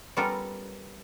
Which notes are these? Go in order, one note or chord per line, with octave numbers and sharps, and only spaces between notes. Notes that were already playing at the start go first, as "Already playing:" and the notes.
G3 B3 C#4 F4 A4 A#4